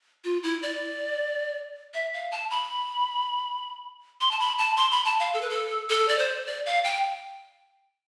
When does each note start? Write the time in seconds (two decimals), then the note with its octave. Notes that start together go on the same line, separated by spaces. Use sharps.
0.24 F4
0.43 E4
0.62 D5
1.94 E5
2.14 F5
2.32 A5
2.51 B5
4.21 C6
4.31 A5
4.40 B5
4.58 A5
4.77 C6
4.91 B5
5.05 A5
5.20 F5
5.34 A4
5.41 B4
5.50 A4
5.90 A4
6.08 D5
6.19 C5
6.47 D5
6.66 F5
6.84 G5